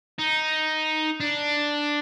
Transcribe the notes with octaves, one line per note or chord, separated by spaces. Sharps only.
D#4
D4